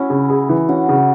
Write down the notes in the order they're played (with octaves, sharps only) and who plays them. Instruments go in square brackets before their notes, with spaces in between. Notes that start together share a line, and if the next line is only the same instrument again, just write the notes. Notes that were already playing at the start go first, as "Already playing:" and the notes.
Already playing: [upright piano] C#4 [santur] E4 F#4
[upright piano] C#3
G#4
E3
[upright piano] C#4 [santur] F#4
[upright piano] C#3